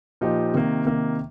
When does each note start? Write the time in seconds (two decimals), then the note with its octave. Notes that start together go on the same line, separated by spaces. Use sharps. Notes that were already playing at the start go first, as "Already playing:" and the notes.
0.21 A#2 F3 D#4 G4
0.54 C3 D#3 A#3
0.85 C3 D#3 A#3